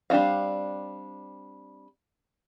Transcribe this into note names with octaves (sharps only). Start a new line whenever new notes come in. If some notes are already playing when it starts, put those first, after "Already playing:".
G3 C4 D4 F#4 F5